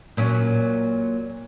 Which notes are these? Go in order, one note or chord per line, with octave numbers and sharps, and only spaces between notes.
A#2 F#3 C#4